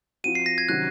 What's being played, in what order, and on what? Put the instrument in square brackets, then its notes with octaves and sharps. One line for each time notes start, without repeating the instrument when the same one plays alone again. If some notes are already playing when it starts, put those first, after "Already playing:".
[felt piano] F3 C4 F#4 [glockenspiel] D#7
[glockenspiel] C7
A#6
G#6
[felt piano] C3 D#3 F#3 C#4 [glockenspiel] F#6